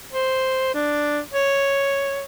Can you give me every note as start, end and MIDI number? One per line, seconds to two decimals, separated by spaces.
0.13 0.70 72
0.75 1.19 62
1.34 2.25 73